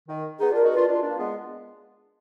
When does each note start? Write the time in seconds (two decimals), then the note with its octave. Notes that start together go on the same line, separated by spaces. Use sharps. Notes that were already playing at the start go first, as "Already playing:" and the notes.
0.08 D#3
0.40 B3 D#4 G#4
0.51 D4 F4 A#4
0.63 D#4 F#4
0.71 D4 F4 B4
0.88 D4 F4
1.03 A#3 D4
1.18 G#3 B3